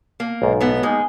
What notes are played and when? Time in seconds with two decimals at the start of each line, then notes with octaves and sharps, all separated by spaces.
0.20 A#3
0.42 B1 G#2
0.60 A2 B3
0.83 G#3 A#3 D#4 G#5